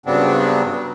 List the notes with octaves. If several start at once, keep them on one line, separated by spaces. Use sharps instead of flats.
G2 C#3 F#3 B3 C4 D4